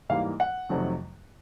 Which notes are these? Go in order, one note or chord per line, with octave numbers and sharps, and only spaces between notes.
G#2 E3 G3 A#3 F5
F#5
F2 C3 D#3 F#3 A3